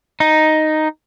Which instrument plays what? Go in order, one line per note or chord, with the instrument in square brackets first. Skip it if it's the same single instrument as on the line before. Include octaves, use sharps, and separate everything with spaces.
[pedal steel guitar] D#4